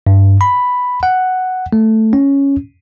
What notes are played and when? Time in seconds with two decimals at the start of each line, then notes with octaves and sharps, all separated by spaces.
0.07 G2
0.41 B5
1.03 F#5
1.73 A3
2.13 C#4